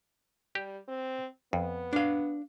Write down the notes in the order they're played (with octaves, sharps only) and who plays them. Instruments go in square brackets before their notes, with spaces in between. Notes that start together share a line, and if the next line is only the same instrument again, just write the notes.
[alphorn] G3 [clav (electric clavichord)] G4
[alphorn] C4
[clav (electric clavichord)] F2 [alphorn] B3
[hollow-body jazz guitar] D4 F5